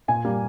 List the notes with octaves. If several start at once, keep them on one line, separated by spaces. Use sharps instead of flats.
A#2 G#5
G3 A#3